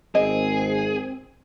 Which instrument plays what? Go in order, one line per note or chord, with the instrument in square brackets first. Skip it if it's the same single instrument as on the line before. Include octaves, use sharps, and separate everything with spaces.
[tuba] G#1 [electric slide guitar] C4 [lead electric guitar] G#4 [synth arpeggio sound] D#5